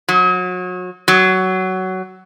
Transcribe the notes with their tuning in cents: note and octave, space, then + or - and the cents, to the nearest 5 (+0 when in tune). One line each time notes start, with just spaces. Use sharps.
F#3 -30
F#3 +15